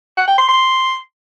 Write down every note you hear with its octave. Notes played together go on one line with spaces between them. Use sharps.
F#5
G5
C6
C6